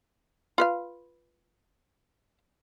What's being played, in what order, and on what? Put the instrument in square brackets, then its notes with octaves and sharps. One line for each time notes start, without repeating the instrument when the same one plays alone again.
[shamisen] F4 B4 F5